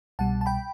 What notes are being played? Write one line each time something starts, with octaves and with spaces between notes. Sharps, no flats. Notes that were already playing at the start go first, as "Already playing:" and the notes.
C2 B2 G3 F#5 A5
A5
G5 B5